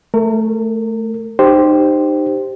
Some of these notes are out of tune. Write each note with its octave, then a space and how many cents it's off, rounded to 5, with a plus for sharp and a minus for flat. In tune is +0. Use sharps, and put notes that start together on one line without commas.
A3 +0 A#4 -30
D#4 -30 G4 -5 C5 +0